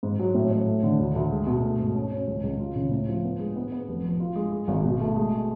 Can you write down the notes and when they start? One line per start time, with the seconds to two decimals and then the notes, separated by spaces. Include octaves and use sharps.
0.03 G#2
0.19 F#3
0.34 A2
0.51 A2
0.67 A3
0.83 D3
1.00 D2
1.16 D2
1.31 G#3
1.47 B2
1.63 A3
1.79 G#2
1.95 C#4
2.12 C#4
2.27 C#2
2.43 C#2
2.59 F4
2.76 C#3
2.91 A2
3.07 F3
3.24 B3
3.39 G#3
3.56 B3
3.72 B3
3.89 F1
4.03 F2
4.20 F4
4.36 G#3
4.52 G#3
4.68 G#1
4.84 B2
5.01 A3
5.16 G#3